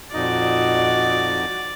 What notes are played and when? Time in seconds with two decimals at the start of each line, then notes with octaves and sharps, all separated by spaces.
0.14 F2 A#2 D#4 F#4 D5 D#5